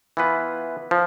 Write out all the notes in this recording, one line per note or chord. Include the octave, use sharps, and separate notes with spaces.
E3 B3 F4 B4
F3